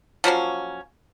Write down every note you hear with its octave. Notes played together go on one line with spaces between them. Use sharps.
F3 F#3 A#3 C#4